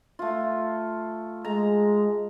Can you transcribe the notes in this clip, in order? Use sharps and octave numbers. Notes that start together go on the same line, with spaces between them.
A3 F4
G#3 A#5